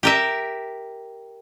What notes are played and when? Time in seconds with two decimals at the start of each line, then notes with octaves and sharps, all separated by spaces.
0.03 G4 A#4 E5